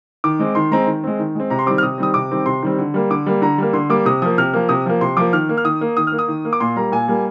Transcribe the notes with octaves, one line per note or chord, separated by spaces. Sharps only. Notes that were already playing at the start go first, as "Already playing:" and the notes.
D#3 D6
G#3 C4
D#3 C6
G#3 C4 A#5
D#3
G#3 C4
D#3
G#3 C4
C3 A#5
C6
D#3 G3 C4 D6
F6
C3 D#6
D#3 G3 C4 D#6
C3 D6
D#3 G3 C4
C3 C6
D#3 G3 C4
D3
G3 A#3
D3 D6
G3 A#3
D3 A#5
G3 A#3
D3 C6
G3 A#3 D6
C3 D#6
F3 A#3 D#6
C3 F6
F3 A#3
C3 D#6
F3 A#3
C3 C6
F3 A#3 D6
D#3 F6
A#3
F6
D#3 D#6
A#3
D#3 D#6
F6
A#3
D#6
D#3
A#3
D6
A#2 C6
G3 A#3 A#5
A#2 G#5
G3 A#3